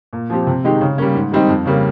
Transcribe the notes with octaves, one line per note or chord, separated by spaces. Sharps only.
A#2
F3 C4 G4
C3
D#3 G#3 D#4 G4
C#3
G3 A#3 C#4
G#2
D#3 G3 C4 D#4
F2
C#3 G3 A#3